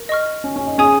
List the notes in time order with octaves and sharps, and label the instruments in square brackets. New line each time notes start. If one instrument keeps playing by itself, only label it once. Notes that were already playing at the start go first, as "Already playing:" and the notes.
Already playing: [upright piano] A#4
[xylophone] D#5 C#6 F6
[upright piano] C#4
C#4
D#4
[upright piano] C#4 [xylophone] G#4 C#5 G#5 D#6